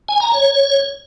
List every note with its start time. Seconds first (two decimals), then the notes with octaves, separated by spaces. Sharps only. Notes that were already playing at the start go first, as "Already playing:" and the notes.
0.09 G#5
0.20 A#5
0.32 C#5